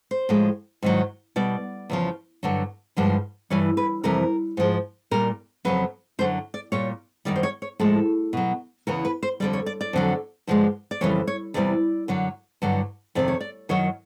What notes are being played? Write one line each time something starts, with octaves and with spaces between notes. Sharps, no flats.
C5
A2 F3 G#3
G#2 D#3 F#3
B2 G3 D5
E2 C#3 F3
G2 D3 F#3
G2 D3 F3 G#3
G2 E3 G3 C#5
B4
F2 C3 E3 G3 A#4
G#2 F3 G#3
A#2 G3 A#4
F2 C#3 F#3 B4
F#2 D3 F#3 C5
D5
A#2 G3 C#5
F#2 D#3 G3 D5
C5
C#5
C#5
A2 F3 G#3 A4
B2 F#3
E2 C#3 E3 A#4
B4
C5
F2 D3 G3 D5
C#5
D5
D5
F2 D3 F#3
G2 D3 F3 G#3
D5
F2 C#3 E3 G3 C#5
C#5
E2 C3 E3 G3 D5
F#2 D3 F#3
G2 D3 F#3
F2 C3 D#3 D5
C#5
D5
F#2 D#3 F#3 C#5